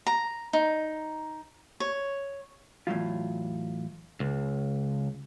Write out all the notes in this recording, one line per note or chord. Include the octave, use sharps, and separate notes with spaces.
A#5
D#4
C#5
E2 A2 D3 F#3 F4
C#2